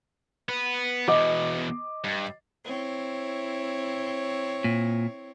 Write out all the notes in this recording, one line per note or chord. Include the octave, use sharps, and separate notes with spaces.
B3
E2 B2 D#5 D6
G2
C4 E4 C#5
A#2